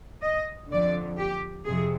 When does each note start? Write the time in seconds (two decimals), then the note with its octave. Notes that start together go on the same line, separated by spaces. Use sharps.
0.23 D#5
0.70 F2 D3 D5
1.18 G4
1.65 F2 C3 G#4